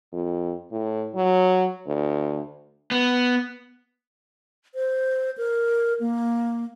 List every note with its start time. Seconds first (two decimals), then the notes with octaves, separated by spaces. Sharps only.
0.12 F2
0.72 A2
1.15 F#3
1.86 D2
2.91 B3
4.75 C5
5.38 A#4
6.00 A#3